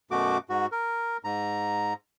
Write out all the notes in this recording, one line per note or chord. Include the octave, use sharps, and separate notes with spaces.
F#2 B2 A3 F#4 D6
G#2 F#4
A#4
G#2 A#5